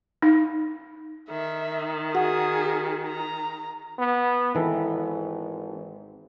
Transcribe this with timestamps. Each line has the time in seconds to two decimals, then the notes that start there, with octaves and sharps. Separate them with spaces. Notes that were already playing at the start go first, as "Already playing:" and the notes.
0.22 D#4
1.30 D#3 E5
2.15 F#4 G#4
3.07 A#5
3.98 B3
4.55 G#1 D#3 E3 A4